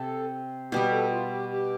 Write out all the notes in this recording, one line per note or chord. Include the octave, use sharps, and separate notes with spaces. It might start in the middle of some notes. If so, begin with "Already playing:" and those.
Already playing: C3 A4
B2 G3 B3 G4
A4
F4
G4
G4